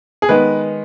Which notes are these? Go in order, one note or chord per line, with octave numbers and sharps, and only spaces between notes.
G#4
D#3 G#3 B3 B4